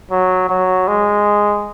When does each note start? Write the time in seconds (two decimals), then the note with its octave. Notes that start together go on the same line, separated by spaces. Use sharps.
0.11 F#3
0.49 F#3
0.87 G#3